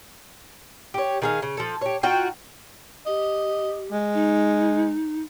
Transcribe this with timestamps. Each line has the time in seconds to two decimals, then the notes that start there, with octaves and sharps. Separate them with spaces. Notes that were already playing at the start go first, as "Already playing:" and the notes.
0.94 G4 C#5
1.22 D#3 G#4 F5
1.42 C#3
1.57 F3 A4
1.81 G4 C#5
2.03 D#4 F4 F#4 G5
3.06 G4 D#5
3.92 G#3
4.13 D#4